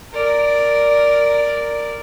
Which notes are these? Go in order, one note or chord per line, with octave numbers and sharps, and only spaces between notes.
A#4 D5